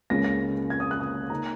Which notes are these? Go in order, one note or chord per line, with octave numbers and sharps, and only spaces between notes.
C#2 C#3 A#3 C#4 A#6
A#6
G#6
D#6
F#6
D#6
C#3 A#3 D#4 A#5